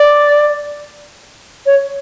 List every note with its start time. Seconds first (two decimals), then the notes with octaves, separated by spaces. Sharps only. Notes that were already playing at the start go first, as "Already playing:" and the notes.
Already playing: D5
1.66 C#5